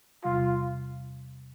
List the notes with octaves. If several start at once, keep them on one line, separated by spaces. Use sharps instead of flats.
E2 C3 G3 F4